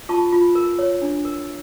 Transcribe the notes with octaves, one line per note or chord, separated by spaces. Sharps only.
F4 A5 C#6
F4
A#4
C#5
D4
A#4